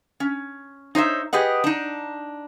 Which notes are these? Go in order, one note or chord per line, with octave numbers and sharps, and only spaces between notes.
C#4
D#4 C5 C#5 E5
G4 G#4 B4 D#5 F#5
D4 D#4